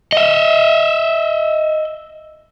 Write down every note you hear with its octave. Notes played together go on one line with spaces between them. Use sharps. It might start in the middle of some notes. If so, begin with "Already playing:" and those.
D#5 E5